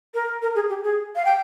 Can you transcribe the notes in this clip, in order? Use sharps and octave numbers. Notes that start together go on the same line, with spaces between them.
A#4
A#4
G#4
G4
G#4
F5
G5